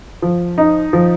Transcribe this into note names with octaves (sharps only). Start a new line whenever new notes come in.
F3
D#4
F3